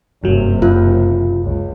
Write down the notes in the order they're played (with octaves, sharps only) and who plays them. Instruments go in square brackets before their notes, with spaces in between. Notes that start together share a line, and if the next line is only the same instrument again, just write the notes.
[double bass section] F#1 C3 [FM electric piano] G2 F#3
[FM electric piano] F#2 [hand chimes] F4
[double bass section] C#2